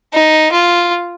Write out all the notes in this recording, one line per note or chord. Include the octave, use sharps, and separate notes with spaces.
D#4
F4